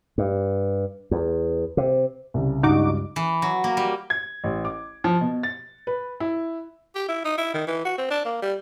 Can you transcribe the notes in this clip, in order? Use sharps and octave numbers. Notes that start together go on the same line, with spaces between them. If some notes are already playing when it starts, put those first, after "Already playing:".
G2
E2
C3
C2 C#3
C#2 G2 D#4 F#4 D6
E3
F#3
A#3
G3
G#6
A1
D6
F3
B2
A6
B4
E4
G4
E4
D#4
E4
D#3
E3
F#4
C4
D4
A#3
G3